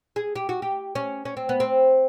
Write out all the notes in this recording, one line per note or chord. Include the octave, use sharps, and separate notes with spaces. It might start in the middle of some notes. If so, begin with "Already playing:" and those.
G#4
G4
F#4
G4
C#4
C#4
C4
B3
C4